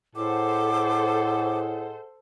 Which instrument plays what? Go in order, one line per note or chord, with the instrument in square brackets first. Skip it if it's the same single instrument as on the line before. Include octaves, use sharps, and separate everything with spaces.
[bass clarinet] A2 [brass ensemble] G#4 D#5 F#5 [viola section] A4 C5 [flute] D6